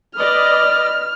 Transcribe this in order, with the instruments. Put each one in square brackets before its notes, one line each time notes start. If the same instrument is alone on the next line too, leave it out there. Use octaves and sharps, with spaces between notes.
[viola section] B4 D5 D#5 [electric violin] F6